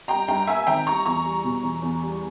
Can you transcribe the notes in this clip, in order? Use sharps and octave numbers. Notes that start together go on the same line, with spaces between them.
G3 G5 A#5
G2 G5 A#5
A#3 E5 G#5
G#1 G5 A#5
G3 A#5 C#6
E2 A#5 C#6
G3
B2
E2
E2
G3